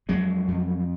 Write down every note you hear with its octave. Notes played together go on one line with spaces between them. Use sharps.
F2 F#3 G#3
F2